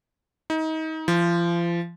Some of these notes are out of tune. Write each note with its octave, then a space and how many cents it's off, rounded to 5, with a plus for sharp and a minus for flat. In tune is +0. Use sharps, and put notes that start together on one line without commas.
D#4 +30
F3 -35